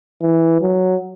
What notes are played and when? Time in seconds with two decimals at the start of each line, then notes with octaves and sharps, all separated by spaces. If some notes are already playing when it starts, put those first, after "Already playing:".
0.21 E3
0.61 F#3